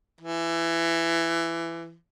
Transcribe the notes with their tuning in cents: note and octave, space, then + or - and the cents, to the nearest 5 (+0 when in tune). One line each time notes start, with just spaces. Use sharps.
E3 +20